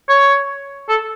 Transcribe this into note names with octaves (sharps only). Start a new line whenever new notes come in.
C#5
A4